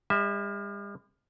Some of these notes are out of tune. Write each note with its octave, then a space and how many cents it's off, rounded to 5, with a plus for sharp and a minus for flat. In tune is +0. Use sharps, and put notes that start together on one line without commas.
G3 +45 E5 -15